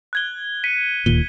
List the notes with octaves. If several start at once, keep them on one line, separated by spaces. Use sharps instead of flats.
F#6 G#6 G7
B6 C#7 D#7
D1 D#2 A#2 G7